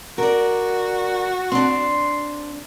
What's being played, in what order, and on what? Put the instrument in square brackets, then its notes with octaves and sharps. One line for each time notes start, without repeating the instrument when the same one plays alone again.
[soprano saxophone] F#4 [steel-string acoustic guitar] A#4 D5
[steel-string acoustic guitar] C4 D4 [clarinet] C6